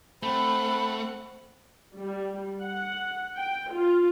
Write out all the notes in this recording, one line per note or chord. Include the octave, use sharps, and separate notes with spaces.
A3 C4 F#5 B5
G3
F#5
G5
F4